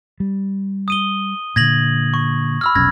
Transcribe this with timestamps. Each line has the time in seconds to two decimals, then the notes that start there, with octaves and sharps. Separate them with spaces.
0.20 G3
0.88 D#6 D#7 G7
1.56 A#2 D3 G#6 A#6 F#7
2.14 C#6
2.61 B5 E6 F6
2.75 F1 B1 C#4 G#6 A#6